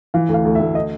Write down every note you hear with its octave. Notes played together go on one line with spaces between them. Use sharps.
E3 F5
D2
F5
D2
E5
D2
D#5